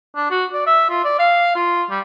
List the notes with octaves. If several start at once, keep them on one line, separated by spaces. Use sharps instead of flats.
D4
F#4
D5
E5
F4
D5
F5
F4
G3